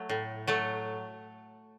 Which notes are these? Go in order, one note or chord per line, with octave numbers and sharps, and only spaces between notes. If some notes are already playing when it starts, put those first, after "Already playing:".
Already playing: F#3 A3
A2
F#3 A3